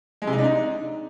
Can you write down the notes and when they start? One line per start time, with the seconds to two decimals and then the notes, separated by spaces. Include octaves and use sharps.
0.22 G#3
0.27 C3
0.33 D#4
0.38 D4
0.44 D#4